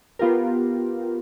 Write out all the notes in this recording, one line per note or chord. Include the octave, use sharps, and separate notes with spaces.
B3 F4 G4 A#4